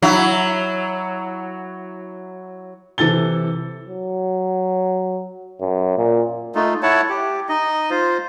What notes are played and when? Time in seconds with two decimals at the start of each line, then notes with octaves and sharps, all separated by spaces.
0.02 F#3 E4
2.98 C3 E3 A4 A6 G7
3.88 F#3
5.61 F#2
5.98 A#2
6.55 A3 D#4 F4
6.83 E4 C#5 F#5 A5
7.10 G4
7.49 D#4 D#5
7.91 F4 C5